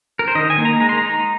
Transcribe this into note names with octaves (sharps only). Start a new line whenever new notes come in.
A#4
C5
D#3 D#5
G#5
A#3 D#4
A#5
G#3 A#5
C6
A#5
D#4